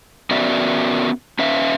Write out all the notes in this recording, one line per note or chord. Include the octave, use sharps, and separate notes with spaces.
B3 C#4 F#4 A#4 D5 E5
C#4 B4 E5 F5